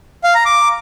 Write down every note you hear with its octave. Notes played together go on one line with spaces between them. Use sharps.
F5
A#5
D6